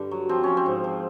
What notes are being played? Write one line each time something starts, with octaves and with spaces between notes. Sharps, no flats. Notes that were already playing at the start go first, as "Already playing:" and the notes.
Already playing: G2 D3
F#3
F3 C4
F3 C#4
C4
G#2
F3